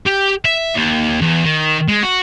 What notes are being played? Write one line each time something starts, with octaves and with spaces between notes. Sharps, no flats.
G4
E5
D#2
E2
D#3
G#3
F#4